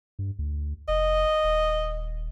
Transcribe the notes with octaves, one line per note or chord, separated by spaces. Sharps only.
G2
D2
F1 D#5
D#1